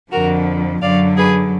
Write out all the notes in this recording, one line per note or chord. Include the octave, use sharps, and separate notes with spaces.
F2 D3 F3 F#4 A#4
F#2 D3 F#3 D5 F5
G#4 B4